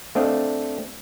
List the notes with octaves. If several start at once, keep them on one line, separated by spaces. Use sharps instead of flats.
A3 C4 D4 D#5 F5